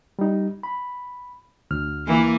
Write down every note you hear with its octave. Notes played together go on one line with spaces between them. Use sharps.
G3 D#4
B5
D2 F6
E3 A#3